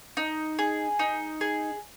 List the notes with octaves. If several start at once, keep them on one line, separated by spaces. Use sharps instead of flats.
D#4
G#4
D#4
G#4